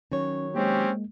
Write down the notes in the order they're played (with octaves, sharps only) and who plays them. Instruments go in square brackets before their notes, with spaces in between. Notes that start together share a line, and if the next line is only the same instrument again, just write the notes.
[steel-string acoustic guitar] D#3 F#3 C#5 [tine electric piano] C#4
[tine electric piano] G#3 A#3 [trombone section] C4 C#4 G4